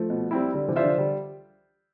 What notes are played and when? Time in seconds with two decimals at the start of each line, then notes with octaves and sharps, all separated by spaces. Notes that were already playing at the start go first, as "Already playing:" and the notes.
Already playing: F3 A3
0.10 B2
0.31 G3 C4 E4
0.54 D3 G3
0.68 C3 E3
0.76 D4 F4 C5 E5
0.83 D3 F3
0.98 D3 G3